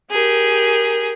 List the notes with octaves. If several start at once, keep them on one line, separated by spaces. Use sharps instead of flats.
G4 G#4 A#4